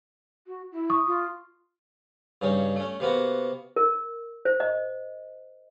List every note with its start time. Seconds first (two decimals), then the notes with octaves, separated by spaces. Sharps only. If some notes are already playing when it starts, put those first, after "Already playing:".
0.47 F#4
0.72 E4
0.90 C#6 D#6
1.07 F4
2.41 G2 C#3 C#4 D#4
2.76 A3 C#4
3.00 C3 A#3 B3 F#4
3.76 A#4
4.45 C5
4.60 D#5